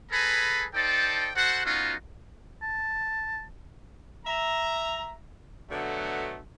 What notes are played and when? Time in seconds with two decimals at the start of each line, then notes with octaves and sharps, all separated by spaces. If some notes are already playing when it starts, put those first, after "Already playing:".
0.12 G#4 A4 B4 G#5 A#5 B5
0.74 D#4 A4 C5 D5 G5 A5
1.36 F#4 A4 C5 F#5
1.65 B3 C#4 D#4 F4 F#4
2.62 A5
4.26 E5 A#5
5.70 B2 D3 F#3 A3